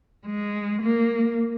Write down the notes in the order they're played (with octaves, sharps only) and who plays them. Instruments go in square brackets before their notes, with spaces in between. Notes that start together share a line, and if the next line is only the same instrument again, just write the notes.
[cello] G#3
A#3